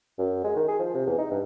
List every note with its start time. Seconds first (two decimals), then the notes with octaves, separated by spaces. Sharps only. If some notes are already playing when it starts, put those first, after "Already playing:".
0.18 F#2
0.44 G#3
0.56 D#3
0.68 G#4
0.79 F3
0.94 C3
1.06 E2
1.18 D#4
1.30 G2